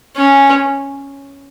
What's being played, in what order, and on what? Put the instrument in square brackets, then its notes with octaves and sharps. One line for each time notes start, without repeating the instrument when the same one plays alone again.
[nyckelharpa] C#4